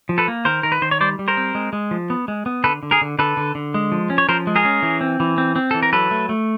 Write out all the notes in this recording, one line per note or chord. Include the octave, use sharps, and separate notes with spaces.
F3
A4 B4
A#3
D#3 A#4 C5
D#3 A#4
B4
D#3 C5
C#5
G3 C5 D5
G3
A#4 C5
C4
G#3
G#3
F3
B3
G#3
B3
D3 A4 B4
D3
G#4 A#4
D3
D3 A4 B4
D3
D3
G#3
F3
C#4
C#5
F3 A#4 C5
G#3
G#4 A#4
C#4
E3
C4
E3
C4
C4
E3 A4
A#4
F#3 A4 B4
A3
A3